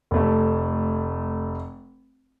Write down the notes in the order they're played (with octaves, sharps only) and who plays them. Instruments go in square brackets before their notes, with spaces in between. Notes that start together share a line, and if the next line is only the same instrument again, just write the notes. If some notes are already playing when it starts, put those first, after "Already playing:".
[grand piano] F1 A3